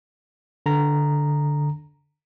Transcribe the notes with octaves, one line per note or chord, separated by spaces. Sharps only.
D3 A#5